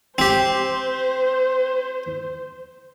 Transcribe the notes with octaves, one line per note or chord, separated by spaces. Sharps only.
C4 G4 C5